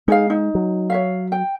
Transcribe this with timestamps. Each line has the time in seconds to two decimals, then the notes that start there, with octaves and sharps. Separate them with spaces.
0.08 G#3 D#4 G#4 F5
0.30 D#4
0.55 F#3
0.90 C#5 E5 F5
1.32 G5